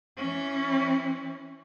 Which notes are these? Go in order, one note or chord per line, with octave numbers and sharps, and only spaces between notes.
E3 C#4